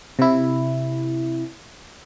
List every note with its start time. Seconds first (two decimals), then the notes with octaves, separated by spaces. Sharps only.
0.19 C3 E4